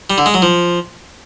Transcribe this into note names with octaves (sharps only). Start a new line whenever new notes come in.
G3
D3
G#3
F#3
F3